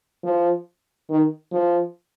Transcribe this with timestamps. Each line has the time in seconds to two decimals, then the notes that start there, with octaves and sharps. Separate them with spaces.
0.24 F3
1.10 D#3
1.52 F3